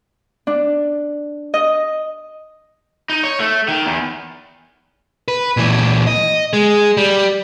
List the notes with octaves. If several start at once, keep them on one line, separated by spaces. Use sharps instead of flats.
D4
D#5
D#4
C#5
A3
D#3
E2
B4
A#2 E3
D#5
G#3
G3